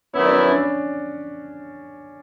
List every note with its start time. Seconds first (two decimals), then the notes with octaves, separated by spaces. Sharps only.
0.14 D#3 F#3 B3 C#4 E4 C#5
0.25 D5
0.32 C#4 C#5
0.51 D4 D5